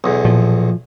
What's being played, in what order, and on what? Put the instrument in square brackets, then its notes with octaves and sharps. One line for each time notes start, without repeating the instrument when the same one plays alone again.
[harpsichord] B1 E2
[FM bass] A#2 [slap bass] F3